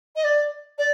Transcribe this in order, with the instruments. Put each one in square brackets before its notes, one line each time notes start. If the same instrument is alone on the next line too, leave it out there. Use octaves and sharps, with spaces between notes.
[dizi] D#5
D5
D5